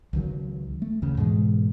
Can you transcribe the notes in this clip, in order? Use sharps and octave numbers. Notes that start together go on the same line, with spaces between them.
C#2 D#3 F#3
A3
D#2 C#3
G#2 B2 E3 G#3